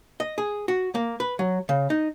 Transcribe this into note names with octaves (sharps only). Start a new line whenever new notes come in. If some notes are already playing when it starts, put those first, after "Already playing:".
D#5
G#4
F#4
A#3
B4
F#3
C#3
D#4